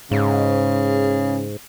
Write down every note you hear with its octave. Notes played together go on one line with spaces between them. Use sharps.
G#2 C#3